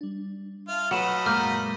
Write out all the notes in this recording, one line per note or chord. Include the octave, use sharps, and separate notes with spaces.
G3 D4
F4 E5 A5 F6
F#3 A3 B4 D#5 F#5 B5 E7
F#2 A#2 G#3 A#3 A#5 F6 G6